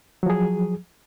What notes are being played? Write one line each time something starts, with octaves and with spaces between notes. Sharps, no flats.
F3 F#3 G#4